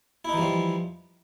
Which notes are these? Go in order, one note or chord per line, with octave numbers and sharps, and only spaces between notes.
E3 F3 G3 D#4 E4